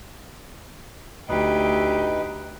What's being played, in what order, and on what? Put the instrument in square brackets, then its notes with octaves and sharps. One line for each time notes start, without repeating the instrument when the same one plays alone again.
[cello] D2 G4 [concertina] D#4 B4 D#5